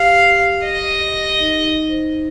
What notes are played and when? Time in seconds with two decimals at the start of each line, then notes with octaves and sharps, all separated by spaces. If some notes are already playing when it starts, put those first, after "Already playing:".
Already playing: G4 F5
0.27 G4
0.65 D#5
1.39 D#4
1.64 D#4
1.88 C5